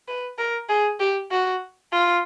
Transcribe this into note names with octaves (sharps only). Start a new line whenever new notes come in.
B4
A#4
G#4
G4
F#4
F4